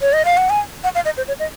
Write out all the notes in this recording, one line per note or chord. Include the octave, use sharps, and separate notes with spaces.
C#5
D#5
F5
F#5
G#5
F#5
F5
D#5
C5
C#5
D#5